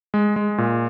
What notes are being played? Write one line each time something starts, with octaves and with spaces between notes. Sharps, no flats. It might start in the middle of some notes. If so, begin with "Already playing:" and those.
G#3
G#3
A#2